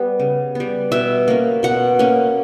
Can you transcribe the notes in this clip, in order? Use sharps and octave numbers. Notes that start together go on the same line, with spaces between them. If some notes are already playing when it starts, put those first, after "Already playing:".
Already playing: G3 B3
C#3
G3 B3
B2 E5
A#3 C#4
B2 F#5
A#3 C#4